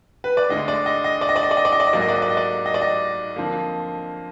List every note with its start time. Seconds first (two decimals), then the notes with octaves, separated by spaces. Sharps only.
0.24 B4
0.37 D5
0.49 D2 D3 G#3 D#5
0.68 D5
0.86 D#5
1.04 D#5
1.21 D5
1.29 D#5
1.36 D5
1.43 D#5
1.51 D5
1.57 D#5
1.65 D5
1.72 D#5
1.80 D5
1.87 D#5
1.93 G#2 F#3 A#3 D5
2.01 D#5
2.09 D5
2.15 D#5
2.22 D5
2.30 D#5
2.37 D5
2.66 D#5
2.74 D5
2.82 D#5
3.36 F2 D3 F3 A#3